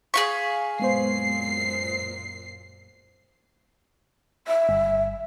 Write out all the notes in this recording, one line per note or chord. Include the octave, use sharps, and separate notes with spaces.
G#4 F5 C#6 B6
F#2 A#2 G#3 B3 C5 C7
E5
G1